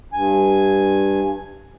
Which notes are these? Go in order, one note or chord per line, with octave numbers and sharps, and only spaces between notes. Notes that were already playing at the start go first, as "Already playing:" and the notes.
G2 G#5